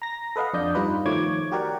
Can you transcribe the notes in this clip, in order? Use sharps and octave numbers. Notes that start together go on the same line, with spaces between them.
A#5 A#6
A4 B4 D#5 F5 F#5
F2 D4 D5 D#5 G6
G2 G3 D#4 F4 B4
D#3 F3 A3 C#5 D6 G#6
F#4 G4 A#4 D5 F#5